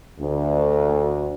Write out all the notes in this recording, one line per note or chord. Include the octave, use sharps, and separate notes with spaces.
D2